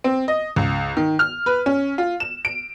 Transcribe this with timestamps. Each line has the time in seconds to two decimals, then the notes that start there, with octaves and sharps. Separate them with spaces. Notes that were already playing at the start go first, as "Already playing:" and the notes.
0.04 C4
0.28 D#5
0.56 C#2
0.97 D#3
1.19 F6
1.46 B4
1.66 C#4
1.98 F4
2.20 E7
2.45 D7